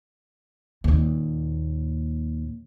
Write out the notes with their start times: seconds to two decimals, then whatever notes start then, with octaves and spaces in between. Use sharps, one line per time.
0.84 D#2 A#2